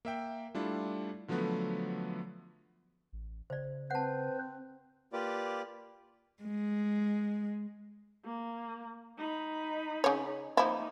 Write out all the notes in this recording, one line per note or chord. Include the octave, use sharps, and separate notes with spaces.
A#3 E5 G5
G3 A3 D4 E4 F4
D3 F3 F#3 A3 B3 B4
A1
C#3 C5 D5
C4 B4 C5 F#5 A5
A#3 F4 G4 B4 D5 D6
G#3
A#3
D#4 B5
C#3 C#5
F3 A#3 D#4 E4